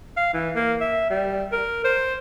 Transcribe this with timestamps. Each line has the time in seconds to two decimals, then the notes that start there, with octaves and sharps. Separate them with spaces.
0.17 F5
0.34 E3
0.55 A#3
0.81 E5
1.10 G3
1.52 A#4
1.84 C5